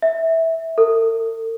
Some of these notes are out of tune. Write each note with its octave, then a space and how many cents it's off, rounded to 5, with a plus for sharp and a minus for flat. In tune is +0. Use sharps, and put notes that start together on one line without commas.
E5 -15
A4 +45